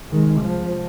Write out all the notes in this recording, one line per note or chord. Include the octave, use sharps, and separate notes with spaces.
C2 C3 D#3 G#3
F3